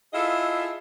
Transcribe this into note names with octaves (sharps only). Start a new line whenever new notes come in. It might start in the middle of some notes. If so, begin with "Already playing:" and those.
E4 F4 G#4 A4 D#5 E5